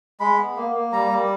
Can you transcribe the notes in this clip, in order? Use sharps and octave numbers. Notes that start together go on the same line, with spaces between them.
G#3 B5
B3
A#3
A#3
G3 A#5
G3